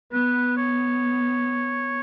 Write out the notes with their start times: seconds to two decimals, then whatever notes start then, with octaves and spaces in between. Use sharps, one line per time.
0.12 B3 B4
0.57 C#5